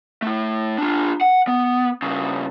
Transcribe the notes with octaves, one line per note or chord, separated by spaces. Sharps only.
A3 E4
D4 F4
F#5
B3
G2 C#3